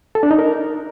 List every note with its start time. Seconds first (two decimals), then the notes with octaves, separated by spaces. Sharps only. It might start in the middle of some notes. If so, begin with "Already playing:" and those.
0.15 A4
0.23 D4
0.31 D#4
0.38 A#4